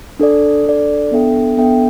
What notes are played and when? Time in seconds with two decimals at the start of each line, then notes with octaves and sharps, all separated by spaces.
0.20 D4 A4 D5
0.65 D4 A4 D5
1.11 B3 D4 A4 E5 G5
1.57 B3 D4 A4 E5 G5